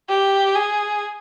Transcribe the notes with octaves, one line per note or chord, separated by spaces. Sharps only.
G4
G#4